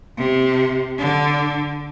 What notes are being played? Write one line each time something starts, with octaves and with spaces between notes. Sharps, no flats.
C3
D3